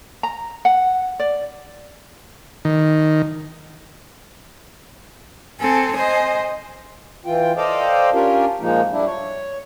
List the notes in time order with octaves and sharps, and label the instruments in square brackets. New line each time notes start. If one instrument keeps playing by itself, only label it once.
[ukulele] A#5
F#5
D5
[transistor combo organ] D#3
[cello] C4 A4 [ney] G#5
[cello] C5 D#5
[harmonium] E3 F4 G5
A4 C5 D5 D#5 F5 G5
C#4 D4 F4 G4 A#4
A#2 F3 G#3 A#3 D#4
G3 D4 E4
C#5